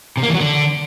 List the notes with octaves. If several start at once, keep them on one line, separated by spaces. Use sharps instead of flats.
C3
A#3
E3
F#3
D3